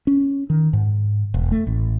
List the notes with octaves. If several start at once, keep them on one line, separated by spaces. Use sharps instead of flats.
C#4
D#3
G#2
E1
A3
A1